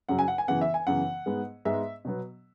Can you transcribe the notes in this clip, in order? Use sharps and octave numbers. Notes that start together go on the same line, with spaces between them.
F#2 C#3 F#3 F#5
G#5
F#5
G#5
F#2 C#3 E3 B3 F#5
E5
G#5
F#2 C#3 E3 B3 F#5
G#2 G#3 B3
G#2 G#3 B3 E5
B2 F#3 B3